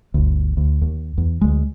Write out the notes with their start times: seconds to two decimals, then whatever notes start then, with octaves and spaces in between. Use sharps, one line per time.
0.14 G1 D2
0.57 D2
0.82 D#2
1.18 E2
1.41 D2 G#3